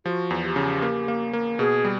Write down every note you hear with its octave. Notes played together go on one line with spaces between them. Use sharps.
F3 F#4 G4
E2
G4
C#3
A#3
A#3
A#3
B2 G#4
G3